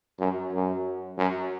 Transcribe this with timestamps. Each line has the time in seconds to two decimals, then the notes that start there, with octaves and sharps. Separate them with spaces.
0.20 F#2
0.53 F#2
1.18 F#2